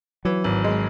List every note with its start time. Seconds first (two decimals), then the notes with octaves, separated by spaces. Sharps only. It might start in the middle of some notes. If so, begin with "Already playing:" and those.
0.25 E3 F#3
0.44 G#1
0.64 G#3